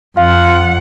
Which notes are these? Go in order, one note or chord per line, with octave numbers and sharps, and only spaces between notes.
F2 F4 F5 F#5